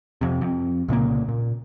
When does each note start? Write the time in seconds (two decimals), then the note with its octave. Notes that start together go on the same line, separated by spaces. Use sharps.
0.21 F2 C3
0.41 F2
0.88 C2 A#2 C#3 A#3
1.28 A#2